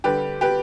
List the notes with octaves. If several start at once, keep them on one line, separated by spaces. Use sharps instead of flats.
D3 G3 G4 B4
G4 B4